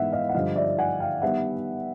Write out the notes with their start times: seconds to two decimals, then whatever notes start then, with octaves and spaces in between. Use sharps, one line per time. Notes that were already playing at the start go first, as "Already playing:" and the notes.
Already playing: G#2 E3 G#3 B3 E5 F#5
0.12 D#5 F5
0.29 F#5
0.34 G2 D3 F3 D#5 F5
0.56 D5 E5
0.78 F#5 G#5
1.00 F5 G5
1.22 D#3 G3 B3 E5 F#5